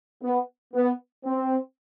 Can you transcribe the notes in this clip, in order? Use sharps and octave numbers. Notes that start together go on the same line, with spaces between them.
B3
B3
C4